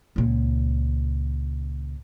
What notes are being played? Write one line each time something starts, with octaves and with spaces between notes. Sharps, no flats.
C#2 A#2